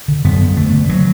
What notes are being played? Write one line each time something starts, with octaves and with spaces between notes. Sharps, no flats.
D3
F#2 B3
D3
D3 A3
D3
D3 F#3